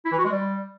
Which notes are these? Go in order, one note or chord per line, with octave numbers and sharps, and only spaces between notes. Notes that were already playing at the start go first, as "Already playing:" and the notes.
E4
E3
F#4
G#3
G3